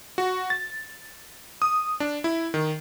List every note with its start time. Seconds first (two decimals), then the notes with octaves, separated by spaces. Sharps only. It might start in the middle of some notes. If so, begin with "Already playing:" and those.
0.18 F#4
0.50 A6
1.62 D#6
2.00 D4
2.24 E4
2.54 D#3